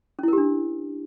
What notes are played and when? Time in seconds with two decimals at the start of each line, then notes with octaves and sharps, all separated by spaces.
0.19 C#4
0.23 E4
0.28 A#4
0.33 G4
0.38 D4